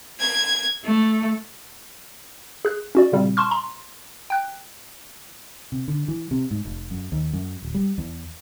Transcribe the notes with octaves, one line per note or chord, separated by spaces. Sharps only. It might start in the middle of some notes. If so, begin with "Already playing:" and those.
G#6
A3
G#4 F#6
C#4 F#4 D5
A#2 C#3 G3 C4
A5 C6 C#6 F6
A#5 C6
G5 F#6
C3
D3
E3
C3
G#2
F1
F#2
D#2
F#2
D1
G3
E2